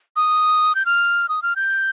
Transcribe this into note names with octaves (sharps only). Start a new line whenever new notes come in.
D#6
G6
F6
D#6
F6
G6